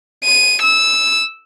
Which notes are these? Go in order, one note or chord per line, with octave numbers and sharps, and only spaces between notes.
D#7
E6